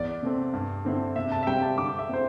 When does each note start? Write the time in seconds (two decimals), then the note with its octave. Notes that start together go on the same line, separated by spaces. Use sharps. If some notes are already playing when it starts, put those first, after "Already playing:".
Already playing: E2 D5
0.23 C3 A3 C4
0.53 G2
0.85 D3 C4 E4
1.16 C3 E5
1.32 A5
1.43 E5
1.47 G3 C4 G4 G5
1.62 A5
1.77 D3 D6
1.99 E5
2.09 C4 E4 C5